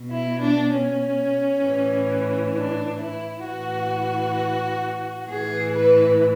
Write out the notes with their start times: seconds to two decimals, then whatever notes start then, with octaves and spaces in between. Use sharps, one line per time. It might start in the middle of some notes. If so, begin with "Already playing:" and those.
Already playing: B2
0.10 E4
0.41 D4
0.72 C#4
1.63 A2 E3
2.54 D4
3.00 E4
3.45 A2 E3 F#4
5.28 A2 E3 G#4
5.74 B4